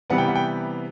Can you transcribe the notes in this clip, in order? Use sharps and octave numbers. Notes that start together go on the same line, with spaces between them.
C3 E3 G3 B3 F#5
G5
F#5
G5